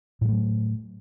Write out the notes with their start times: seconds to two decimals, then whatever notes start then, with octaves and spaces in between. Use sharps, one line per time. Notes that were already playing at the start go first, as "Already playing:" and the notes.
0.21 A2
0.25 G#3
0.29 A3
0.32 F#3